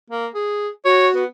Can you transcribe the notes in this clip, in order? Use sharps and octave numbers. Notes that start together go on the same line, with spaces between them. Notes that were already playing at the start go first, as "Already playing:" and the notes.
A#3
G#4
F#4 C#5
B3